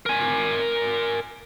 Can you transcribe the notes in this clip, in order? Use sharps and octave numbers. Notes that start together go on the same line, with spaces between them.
A#4 G#5